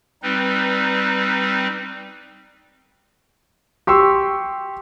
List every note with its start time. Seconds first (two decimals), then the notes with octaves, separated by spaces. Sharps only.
0.23 G3 C4 D#4 B4
3.87 G4 C6 C#6 E6